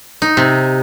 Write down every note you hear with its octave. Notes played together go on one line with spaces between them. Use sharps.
D#4
C3